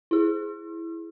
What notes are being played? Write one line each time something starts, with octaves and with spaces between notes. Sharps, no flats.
E4 G#4